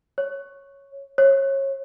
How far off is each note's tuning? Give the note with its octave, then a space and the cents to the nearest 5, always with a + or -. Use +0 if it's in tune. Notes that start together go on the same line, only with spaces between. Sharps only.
C#5 -5
C#5 -25